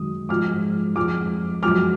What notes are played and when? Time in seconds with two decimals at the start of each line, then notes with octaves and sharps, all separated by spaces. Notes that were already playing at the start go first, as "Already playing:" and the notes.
Already playing: F#2 D#3 G#3 D#6
0.29 G#2 F3 G#3 D6 F6
0.96 F2 F3 G#3 D6 F6
1.63 F#2 F3 G#3 D6 F6